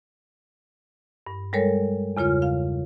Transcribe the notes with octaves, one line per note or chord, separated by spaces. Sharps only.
G2
G3 G#3 A4 A#4 C#5
E2 C#3 F4 C#5 F6
F5